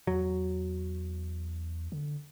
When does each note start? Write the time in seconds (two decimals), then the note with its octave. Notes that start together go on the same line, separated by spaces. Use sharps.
0.07 E2 F#3
1.92 D3